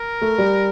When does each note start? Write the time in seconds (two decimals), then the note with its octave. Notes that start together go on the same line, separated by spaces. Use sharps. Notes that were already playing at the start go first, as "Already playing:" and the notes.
Already playing: A#4
0.22 A3
0.38 G3